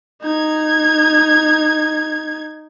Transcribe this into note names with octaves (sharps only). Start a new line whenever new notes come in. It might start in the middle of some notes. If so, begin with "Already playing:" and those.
D#4 G#6